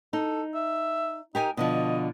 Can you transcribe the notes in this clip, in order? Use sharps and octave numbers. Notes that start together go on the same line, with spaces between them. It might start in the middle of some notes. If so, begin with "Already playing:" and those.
D#4 A4
E5
D#4 G4 A#4 G#5
B2 D3 F3 D#5